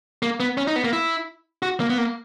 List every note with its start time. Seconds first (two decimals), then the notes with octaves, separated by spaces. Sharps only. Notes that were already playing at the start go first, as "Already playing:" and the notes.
0.23 A#3
0.40 B3
0.58 C#4
0.67 D#4
0.76 B3
0.84 A#3
0.93 E4
1.63 F#4
1.80 A#3
1.90 B3
1.98 A#3